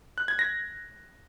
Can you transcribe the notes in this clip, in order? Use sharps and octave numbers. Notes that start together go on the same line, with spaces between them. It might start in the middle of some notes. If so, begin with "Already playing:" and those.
F#6
G#6
A#6